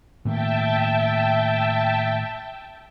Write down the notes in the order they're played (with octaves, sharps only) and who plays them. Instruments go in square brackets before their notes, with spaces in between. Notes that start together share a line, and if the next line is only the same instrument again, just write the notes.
[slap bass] A2 D#3 A#3 [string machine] E5 G5 A5